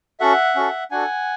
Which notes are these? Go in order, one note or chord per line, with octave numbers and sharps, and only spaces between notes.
C#4 F#4 A4 E5 F#5
C#4 F#4 A4
D4 F#4 A4 F#5 G#5